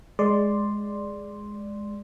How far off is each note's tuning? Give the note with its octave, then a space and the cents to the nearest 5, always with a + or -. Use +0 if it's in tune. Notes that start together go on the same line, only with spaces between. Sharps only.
G#3 +0 D5 +0 C6 +0